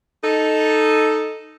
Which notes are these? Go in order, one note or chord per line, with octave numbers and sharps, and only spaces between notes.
D#4 A4